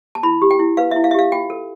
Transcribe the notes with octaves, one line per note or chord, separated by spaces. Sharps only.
A5
E4 B5
G4
G5
E4
B4 F5
E5
E4
F5
E5
G4 F5
F4 G5
A4